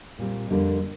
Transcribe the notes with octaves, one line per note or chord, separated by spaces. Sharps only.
A#2 G3 C4
F2 D3 G3 A#3